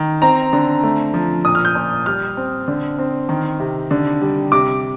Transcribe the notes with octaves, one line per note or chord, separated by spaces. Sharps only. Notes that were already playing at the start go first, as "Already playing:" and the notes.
Already playing: D#3
C4 A#5
D3
A3
F3
A#2 D#6
F6
G6
A#2
G3 F6
C4
D3
C4
D#3
C3
D3
G3
C3 D6